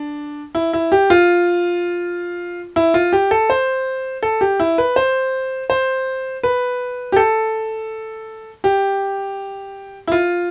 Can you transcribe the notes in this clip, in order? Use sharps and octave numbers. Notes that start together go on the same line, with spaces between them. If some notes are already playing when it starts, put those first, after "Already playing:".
Already playing: D4
E4
E4
G4
F4
E4
F4
G4
A4
C5
A4
G4
E4
B4
C5
C5
B4
G4
A4
G4
E4
F4